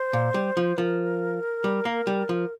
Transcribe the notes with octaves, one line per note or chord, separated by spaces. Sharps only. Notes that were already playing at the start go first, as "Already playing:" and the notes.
Already playing: C5
A#2
G3
F3
F3 A#4
G3
A#3
G3
F3